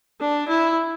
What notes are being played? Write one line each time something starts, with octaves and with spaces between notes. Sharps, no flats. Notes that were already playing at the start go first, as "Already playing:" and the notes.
D4
E4